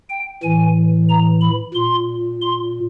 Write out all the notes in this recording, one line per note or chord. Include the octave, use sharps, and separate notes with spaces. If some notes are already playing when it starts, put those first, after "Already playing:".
G5
A2 E3 G#5
A#5
B5
A#2 C6
C6